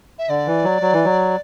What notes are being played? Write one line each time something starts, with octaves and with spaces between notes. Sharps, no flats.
E5
D3 D5
E3
F#3
F#3
E3
F#3